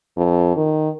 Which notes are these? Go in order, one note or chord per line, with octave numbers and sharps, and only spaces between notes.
F2
D#3